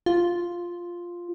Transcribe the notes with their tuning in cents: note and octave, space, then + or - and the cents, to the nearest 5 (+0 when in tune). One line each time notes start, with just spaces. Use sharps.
F4 +0